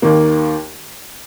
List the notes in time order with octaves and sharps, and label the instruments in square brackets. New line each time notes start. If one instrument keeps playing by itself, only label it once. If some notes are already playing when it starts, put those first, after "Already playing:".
[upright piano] D#2 D#3 A#3